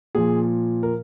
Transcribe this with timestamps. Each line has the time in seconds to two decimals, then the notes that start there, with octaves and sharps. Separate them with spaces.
0.15 A#2 F3 G#4
0.83 A#4